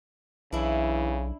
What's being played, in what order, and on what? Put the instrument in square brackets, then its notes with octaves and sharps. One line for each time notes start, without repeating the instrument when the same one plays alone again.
[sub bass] B1 [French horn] C#3 [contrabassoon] E3 [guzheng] D4 E4